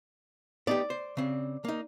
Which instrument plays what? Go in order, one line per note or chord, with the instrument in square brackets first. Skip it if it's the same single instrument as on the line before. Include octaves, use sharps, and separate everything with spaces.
[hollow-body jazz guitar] B3 D#4 G4 [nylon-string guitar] D5
[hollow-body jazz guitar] C5
C#3 C4
A#3 D#4